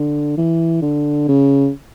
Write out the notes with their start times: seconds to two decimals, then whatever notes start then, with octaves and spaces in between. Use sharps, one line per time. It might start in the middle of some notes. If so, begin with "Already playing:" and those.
Already playing: D3
0.37 E3
0.82 D3
1.28 C#3